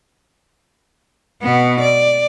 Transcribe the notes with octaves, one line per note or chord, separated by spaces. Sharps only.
B2 B3
D5